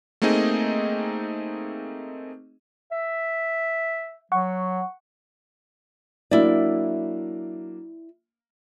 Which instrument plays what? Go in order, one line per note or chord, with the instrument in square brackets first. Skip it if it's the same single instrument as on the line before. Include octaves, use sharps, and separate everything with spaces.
[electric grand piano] A3 A#3 C4 D#4 G#4 D#5
[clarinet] E5
[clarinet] F#3 [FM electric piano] F#5 C#6
[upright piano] F#3 A#3 D4 [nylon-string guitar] E4 D5